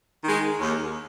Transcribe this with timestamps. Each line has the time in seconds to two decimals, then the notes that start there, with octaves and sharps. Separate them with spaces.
0.24 D#3 G#3
0.59 D#2